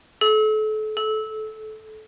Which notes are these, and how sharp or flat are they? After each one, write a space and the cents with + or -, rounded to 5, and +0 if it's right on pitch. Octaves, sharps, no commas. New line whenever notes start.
A4 -35
A4 -20